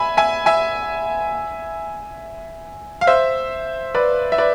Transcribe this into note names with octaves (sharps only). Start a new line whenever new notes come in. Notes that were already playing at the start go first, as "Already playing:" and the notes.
Already playing: E5 G#5 B5
E5 G#5
E5 G#5
F5
C5 E5
B4 D5
E5
B4 D5